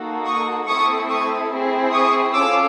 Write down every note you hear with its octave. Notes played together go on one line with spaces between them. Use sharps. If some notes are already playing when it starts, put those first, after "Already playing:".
Already playing: A#3 D#4 F#4 A4
C#6 D#6
A3 C4 E4 A4 C#6 D#6
C#6 D#6
C4 E4 G#4
C#6 D#6
C#4 F4 A4 D6 E6